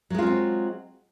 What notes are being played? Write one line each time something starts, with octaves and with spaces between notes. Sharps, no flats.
F#3 G#3 C4 C#4 F4